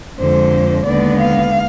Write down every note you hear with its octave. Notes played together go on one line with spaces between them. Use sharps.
F2 D3 G#3 C5
D#2 D3 G#3 B3 D5
F5